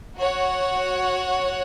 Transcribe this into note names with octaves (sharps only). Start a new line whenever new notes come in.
F#4 C#5 F#5